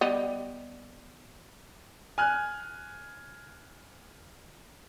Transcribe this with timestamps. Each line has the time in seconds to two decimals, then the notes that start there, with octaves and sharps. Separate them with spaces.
0.01 G3 B3 D#5
2.18 G#5 F6 F#6